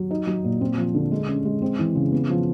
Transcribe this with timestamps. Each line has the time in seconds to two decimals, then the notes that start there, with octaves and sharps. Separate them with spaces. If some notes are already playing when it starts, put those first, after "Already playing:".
Already playing: F#3
0.11 D#4
0.27 F#3
0.44 A#2
0.61 C4
0.78 F3
0.94 D3
1.12 G#3
1.28 C#4
1.45 G#3
1.62 C4
1.79 E3
1.95 C#3
2.12 B3
2.30 F3